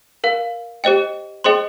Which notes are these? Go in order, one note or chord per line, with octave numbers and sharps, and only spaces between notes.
A#4 F5
G4 C5 D#5 G5
G#4 C5 D#5 G5 C6